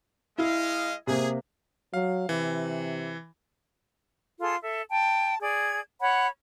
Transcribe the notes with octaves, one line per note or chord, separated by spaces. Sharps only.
G#3 E4 D#5 F5
C3 A#3 G#4
F#3 F5
C3 E3
F4 G#4 A4 C6
A4 E5
G5 A5
G#4 D5 G#6
C#5 F#5 B5